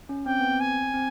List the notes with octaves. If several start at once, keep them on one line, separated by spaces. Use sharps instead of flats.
C#4
C4 G5
B3
C4
G#5
C4